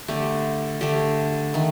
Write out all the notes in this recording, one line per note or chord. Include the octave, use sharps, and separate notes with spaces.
D3 A3 G4
D3 A3 G4
D#3 A3